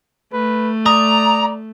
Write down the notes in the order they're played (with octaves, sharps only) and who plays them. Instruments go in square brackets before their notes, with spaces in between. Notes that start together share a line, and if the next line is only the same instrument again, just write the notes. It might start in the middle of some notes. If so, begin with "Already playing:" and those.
[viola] A3 [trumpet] B4
[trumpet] D5 [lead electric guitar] A#5 [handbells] D#6